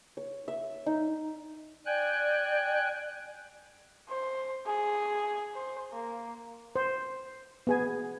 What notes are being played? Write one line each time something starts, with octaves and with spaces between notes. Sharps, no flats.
C#5
E5
D#4
D5 G5 G#5 F#6
C5
G#4
C5
A#3
C5
B3 G#4 G#5